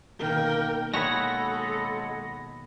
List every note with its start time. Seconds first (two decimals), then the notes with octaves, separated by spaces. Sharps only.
0.19 B2 D#3 A#3 A#4 G5
0.94 G#3 F#4 A4 C#5 B5 A#6